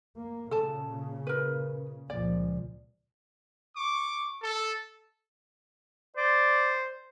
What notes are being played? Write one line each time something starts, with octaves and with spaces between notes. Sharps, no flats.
A#3
A#2 C#3 A4 A5
A#4 B4
C#2 A#2 F3 D5
C#6 D6
A4
C5 D5